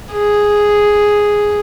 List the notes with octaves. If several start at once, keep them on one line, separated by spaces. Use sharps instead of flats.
G#4